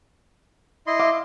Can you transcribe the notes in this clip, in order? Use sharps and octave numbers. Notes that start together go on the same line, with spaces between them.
E4 D#5 C6
E5 F5 D6